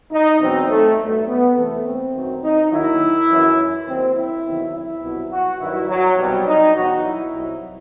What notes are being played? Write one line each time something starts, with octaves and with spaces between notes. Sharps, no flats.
D#4
E2 B2 F#3 C4
A3
G2 F#3 A3
B3
E2 C3 E3 A3
C4
F#2 D#3 F#3
D#4
D#2 D#3 F#3 E4
F#2 E3
D#2 D#3 F#3 C4
E4
E2 C3 D#3 F#3
E4
C2 B2 F#3
F#4
G2 D#3 F#3 E4
F#3
C2 B2 F#3 G3
D#4
E2 B2 F#3 F#4
E4
C2 C3 F#3